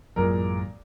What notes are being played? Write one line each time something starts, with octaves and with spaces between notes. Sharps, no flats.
A1 F#2 A#2 F#3 G#3 A#4